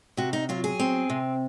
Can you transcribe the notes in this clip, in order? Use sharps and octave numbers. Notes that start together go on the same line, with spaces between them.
C3 F#4
D#4
F#3 F4
G#4
C4
C3